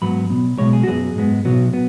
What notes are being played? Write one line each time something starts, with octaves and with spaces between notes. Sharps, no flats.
G#2 F#3 B3 B5
B1 B2 B3
B1 B2 G#3 C#5
G#4
F#4
F#2 F#3 B3 G#4
G#2 G#3 B3
B1 B2 F#3 B3
B3